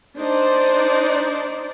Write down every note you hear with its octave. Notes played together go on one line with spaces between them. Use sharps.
D4 D#4 C5 D5